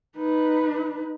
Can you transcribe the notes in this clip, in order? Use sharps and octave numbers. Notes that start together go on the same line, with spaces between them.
D#4 B4